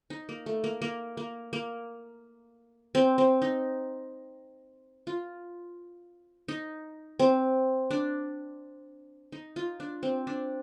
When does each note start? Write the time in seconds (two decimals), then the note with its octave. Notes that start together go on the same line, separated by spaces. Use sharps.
0.10 D#4
0.29 A#3
0.46 A3
0.64 A#3
0.82 A#3
1.17 A#3
1.53 A#3
2.95 C4
3.18 C4
3.42 D#4
5.07 F4
6.48 D#4
7.19 C4
7.91 D4
9.32 D#4
9.56 F4
9.80 D4
10.03 C4
10.27 D4